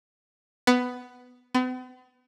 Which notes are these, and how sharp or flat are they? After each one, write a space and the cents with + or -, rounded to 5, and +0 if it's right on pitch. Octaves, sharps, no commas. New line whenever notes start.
B3 +10
B3 +45